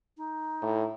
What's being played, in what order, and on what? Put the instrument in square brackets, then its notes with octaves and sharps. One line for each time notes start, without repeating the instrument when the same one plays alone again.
[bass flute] D#4
[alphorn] A2